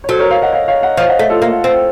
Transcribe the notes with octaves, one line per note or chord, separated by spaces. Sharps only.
C#5
F#3 A4 C5
A#4 C#5
C#5 F5
D#5 F#5
C#5 F5
C#5 F5
D#5 F#5
F3 C#5 F5
D#5 F#5
A3
F4 A4
A#3
C4